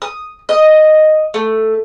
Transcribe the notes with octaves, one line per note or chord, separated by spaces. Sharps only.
D#6
D#5
A3